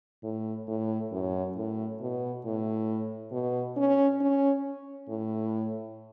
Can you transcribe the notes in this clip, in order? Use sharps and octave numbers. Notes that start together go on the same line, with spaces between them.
A2
A2
F#2
A2
B2
A2
B2
C#4
C#4
A2